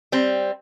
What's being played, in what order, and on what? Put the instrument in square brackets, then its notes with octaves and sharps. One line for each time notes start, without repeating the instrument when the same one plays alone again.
[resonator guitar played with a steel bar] G3 C4